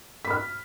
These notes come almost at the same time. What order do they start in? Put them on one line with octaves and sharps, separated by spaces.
B6 B5 F6